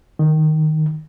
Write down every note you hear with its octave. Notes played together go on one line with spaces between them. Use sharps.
D#3